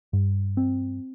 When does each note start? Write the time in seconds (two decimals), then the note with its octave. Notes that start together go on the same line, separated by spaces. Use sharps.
0.13 G2
0.57 C4